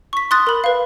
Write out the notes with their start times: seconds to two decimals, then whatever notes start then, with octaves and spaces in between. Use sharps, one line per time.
0.13 C#6 B6
0.31 C6 D#6 F#6 A6
0.47 A#4 B5
0.64 B4 F5